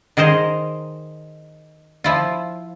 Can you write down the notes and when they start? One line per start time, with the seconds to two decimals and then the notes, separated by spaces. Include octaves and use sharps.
0.17 D#3 G#4 A#4 C5 D#5
2.04 F3 E4 F4